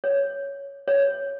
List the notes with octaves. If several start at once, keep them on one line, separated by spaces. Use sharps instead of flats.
C#5
C#5